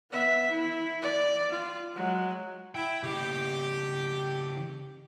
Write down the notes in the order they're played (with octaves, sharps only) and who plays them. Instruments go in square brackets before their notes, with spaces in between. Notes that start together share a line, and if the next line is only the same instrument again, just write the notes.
[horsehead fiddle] B3 E5
E4
D5
F4
F#3 G#3
[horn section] E4 [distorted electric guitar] G5
[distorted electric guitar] C#3 E4 [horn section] G4